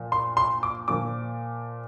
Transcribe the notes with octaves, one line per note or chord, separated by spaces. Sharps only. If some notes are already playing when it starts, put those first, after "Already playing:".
Already playing: A#2 F3
C6
C6
D6
A#2 F3 D6